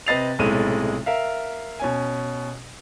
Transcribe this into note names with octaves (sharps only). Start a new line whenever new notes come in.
C3 B4 D#5 A6 C7 F7
B1 A2 C3 G#3 D#7
A#4 E5 F5
B2 C#4 G#5